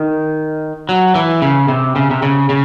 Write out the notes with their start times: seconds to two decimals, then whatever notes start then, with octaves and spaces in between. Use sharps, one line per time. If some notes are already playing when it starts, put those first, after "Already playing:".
Already playing: D#3
0.89 F#3
1.15 E3
1.42 C#3
1.68 C3
1.96 C#3
2.11 C3
2.22 C#3
2.49 C#3